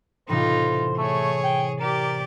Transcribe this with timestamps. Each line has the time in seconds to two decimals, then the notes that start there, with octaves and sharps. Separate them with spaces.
0.29 A2 C3 E3 D#4 F4 C5
0.98 A3 G#4 C#5
1.44 G5
1.80 G4 A#4 D5